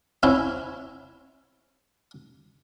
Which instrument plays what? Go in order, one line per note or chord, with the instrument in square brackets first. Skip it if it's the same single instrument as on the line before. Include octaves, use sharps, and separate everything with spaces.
[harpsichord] C4 C#4 E4